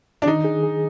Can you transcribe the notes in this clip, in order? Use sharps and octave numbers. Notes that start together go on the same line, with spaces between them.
D4
D#3 D#4
G#4
G#4